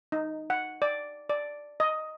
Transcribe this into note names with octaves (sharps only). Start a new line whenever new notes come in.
D#4
F#5
D5
D5
D#5